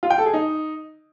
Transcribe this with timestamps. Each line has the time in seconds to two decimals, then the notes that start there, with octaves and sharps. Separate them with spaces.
0.03 F4
0.10 G5
0.18 A4
0.26 G#4
0.34 D#4